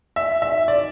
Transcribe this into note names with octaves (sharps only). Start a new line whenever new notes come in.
E5
E5
D5